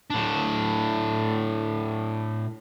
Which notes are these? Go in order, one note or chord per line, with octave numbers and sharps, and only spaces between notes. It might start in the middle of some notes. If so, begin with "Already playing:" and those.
A2 D4